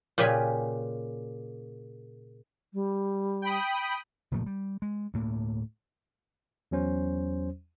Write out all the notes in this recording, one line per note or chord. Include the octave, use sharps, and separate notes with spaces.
A#2 C#3 G4 B4 G#5 B5
G3
G5 B5 D#6
F#1 A#2 F3 A3
G3
G#3
D2 A2 A#3
E2 F#3 C#4 C5